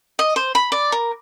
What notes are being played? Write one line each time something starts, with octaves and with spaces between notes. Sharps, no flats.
D#5
C5
B5
D5
A#4